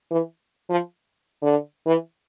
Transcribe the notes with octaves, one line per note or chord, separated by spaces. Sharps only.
E3
F3
D3
E3